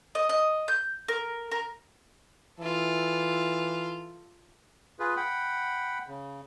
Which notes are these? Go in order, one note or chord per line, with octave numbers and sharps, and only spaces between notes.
D#5
D#5
G6
A#4
A#4
E3 F4 A4
F4 G#4 B4
F#5 G5 B5
C#3